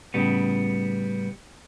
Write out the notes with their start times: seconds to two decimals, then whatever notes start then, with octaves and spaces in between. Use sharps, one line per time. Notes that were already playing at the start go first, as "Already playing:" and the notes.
0.14 A2 C#3 G3 B3